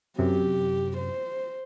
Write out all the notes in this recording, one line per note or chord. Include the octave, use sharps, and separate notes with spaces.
F#2 C3 G4
C5